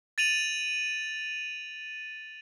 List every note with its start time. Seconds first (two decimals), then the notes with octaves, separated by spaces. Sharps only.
0.18 A6 D#7 F7 F#7